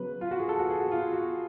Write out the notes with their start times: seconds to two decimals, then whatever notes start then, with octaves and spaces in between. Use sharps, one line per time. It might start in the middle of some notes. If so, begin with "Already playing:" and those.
Already playing: C#3 F#3 B3 B4
0.21 F4
0.31 F#4
0.40 G#4
0.49 A4
0.59 F#4
0.70 G#4
0.80 F#4
0.92 F4
1.12 F#4